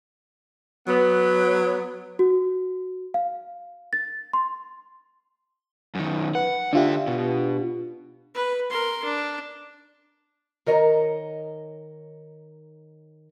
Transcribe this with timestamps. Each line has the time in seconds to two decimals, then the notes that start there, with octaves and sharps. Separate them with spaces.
0.87 F#3 B3
2.19 F#4
3.14 F5
3.93 A6
4.33 C6
5.95 F#2 D#3
6.35 B4 F#5
6.73 D3 D4 F4 G4 E5
7.07 B2
8.34 B4
8.70 A#4 C6
9.04 D4
10.66 D#3 A#4 C#5 D#5 A#5